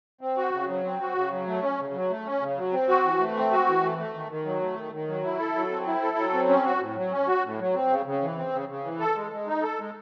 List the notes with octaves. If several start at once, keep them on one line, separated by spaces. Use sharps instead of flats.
C4
F#4
C#3
F#3
C4
F#4
C#3
F#3
A3
C#4
C#3
F#3
A3
C#4
C#3
F#3
C4
F#4
E3
A3
C4
F#4
E3
A3
A3
D#3
D#3
F#3
A3
D#3
D#3
F#3
E4
A4
F#3
C4
E4
A4
F#3
C4
C#4
F#4
A2
F#3
C#4
F#4
A2
F#3
C4
C#3
C#3
E3
C4
C#3
C#3
E3
A4
G#3
G#3
D#4
A4
G#3